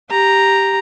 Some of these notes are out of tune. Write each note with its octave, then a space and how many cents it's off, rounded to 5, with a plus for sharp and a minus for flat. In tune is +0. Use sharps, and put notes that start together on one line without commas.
G4 +0 A#5 +0